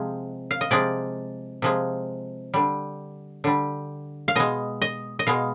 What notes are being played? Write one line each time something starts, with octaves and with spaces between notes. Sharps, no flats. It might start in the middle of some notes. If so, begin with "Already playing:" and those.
Already playing: C3 F3 G#3
F5
D#5
C3 F3 G#3 D5
C3 F3 G#3
D3 G3
D3 G3
F5
B2 G#3 D#5
D#5
D#5
B2 G#3 F5